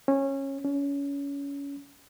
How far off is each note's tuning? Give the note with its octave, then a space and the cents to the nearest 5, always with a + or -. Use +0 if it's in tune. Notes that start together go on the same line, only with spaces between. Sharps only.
C#4 -20
C#4 +25